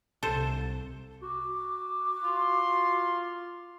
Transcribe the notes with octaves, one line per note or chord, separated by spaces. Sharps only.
C2 A4 C5
F#4 D6
F4 C6